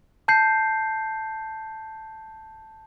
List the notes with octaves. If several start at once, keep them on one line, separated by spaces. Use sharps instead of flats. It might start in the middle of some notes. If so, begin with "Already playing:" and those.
A5 G6 C7